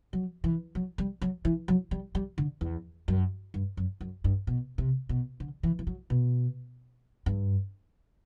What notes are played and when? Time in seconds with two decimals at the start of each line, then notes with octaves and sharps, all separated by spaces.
0.13 F#3
0.44 E3
0.75 F#3
0.98 G3
1.22 F#3
1.45 E3
1.68 F#3
1.91 G3
2.15 G3
2.38 D3
2.61 E2
3.08 F#2
3.54 G2
3.77 F#2
4.01 F#2
4.24 G2
4.47 B2
4.78 C3
5.09 B2
5.40 D3
5.63 E3
5.79 E3
5.87 F#3
6.10 B2
7.26 G2